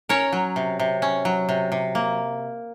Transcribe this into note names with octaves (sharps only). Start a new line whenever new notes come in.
C#4 A#4 C#5
F#3
C3
C3
C#4
F#3
C3
C3
A#3